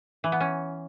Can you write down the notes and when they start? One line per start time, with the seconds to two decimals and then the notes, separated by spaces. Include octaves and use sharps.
0.24 E3
0.32 B3
0.40 C#4